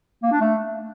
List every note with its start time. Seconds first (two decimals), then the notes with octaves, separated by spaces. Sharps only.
0.23 A#3
0.32 D4
0.41 A3